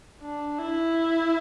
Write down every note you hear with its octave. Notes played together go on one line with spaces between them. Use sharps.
D4
E4